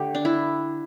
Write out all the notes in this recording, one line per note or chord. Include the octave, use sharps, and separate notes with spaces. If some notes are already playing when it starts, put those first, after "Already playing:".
Already playing: D3 A3 G4
D4
E4